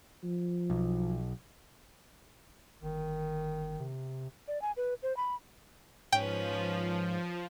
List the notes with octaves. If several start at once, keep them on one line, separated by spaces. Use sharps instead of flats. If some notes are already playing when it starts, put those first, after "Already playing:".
F3
B1
G1 D#3
C3
D5
G#5
B4
C5
B5
G#2 F3 C#4 B4 G5